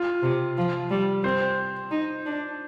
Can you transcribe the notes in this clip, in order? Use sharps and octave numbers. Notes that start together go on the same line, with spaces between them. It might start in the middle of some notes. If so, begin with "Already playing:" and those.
Already playing: F4
C3
F3
G3
C4 C5
D#4
D4